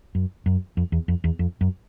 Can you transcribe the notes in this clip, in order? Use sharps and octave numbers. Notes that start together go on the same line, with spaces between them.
F#2
F#2
F2
E2
F2
E2
F2
F#2